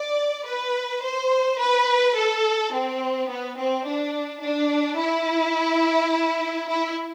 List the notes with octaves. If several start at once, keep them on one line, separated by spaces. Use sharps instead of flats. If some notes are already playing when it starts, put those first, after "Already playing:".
Already playing: D5
B4
C5
B4
A4
C4
B3
C4
D4
D4
E4
E4